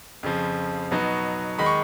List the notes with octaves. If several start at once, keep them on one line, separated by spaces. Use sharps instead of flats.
F2 C#3 F3
B2 F#3 B3 D#4
D#3 G#3 B5
C#6